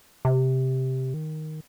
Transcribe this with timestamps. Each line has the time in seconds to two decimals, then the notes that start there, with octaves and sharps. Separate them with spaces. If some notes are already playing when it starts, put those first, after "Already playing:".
0.25 C3
1.14 D#3